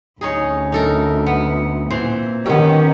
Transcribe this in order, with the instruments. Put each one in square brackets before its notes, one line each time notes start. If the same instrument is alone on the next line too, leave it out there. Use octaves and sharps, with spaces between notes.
[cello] D2 [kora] C#4 D#4 G#4
[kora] D#4 A4 A#4
B3
[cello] A#2 [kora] E3 C4 C5
[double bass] D#3 [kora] B3 G4 [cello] C#4